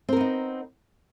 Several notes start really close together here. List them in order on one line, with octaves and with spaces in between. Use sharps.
C4 A#4 B3 D#4